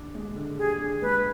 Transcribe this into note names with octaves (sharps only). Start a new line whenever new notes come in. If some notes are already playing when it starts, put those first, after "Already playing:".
Already playing: D3 D4
G#3
D3
G4 G#4
D4
G#3 B4